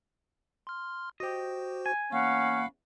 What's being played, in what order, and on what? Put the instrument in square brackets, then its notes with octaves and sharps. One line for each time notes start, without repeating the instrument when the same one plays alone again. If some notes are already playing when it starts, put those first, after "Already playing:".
[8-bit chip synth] C6 F6
[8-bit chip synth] F#4 C5 [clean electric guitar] G4 D#5
[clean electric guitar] G#5
[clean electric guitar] E2 [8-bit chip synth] A#3 [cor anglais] C#4 [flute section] F5 F#5 B5